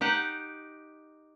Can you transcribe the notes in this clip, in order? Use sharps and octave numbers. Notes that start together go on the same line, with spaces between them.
D#4 G4 F#5